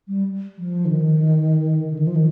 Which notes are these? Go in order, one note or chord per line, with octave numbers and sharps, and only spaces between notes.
G3
F3
D3
D#3
D3
D#3
F3
D#3